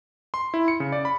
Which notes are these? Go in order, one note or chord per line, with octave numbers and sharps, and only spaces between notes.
C6
E4
C#7
C#3
D5
B5